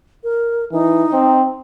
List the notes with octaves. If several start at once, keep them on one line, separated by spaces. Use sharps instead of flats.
A#4
E3 D#4
C4